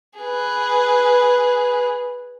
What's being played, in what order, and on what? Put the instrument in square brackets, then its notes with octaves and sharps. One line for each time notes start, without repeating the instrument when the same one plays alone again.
[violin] G#4 B4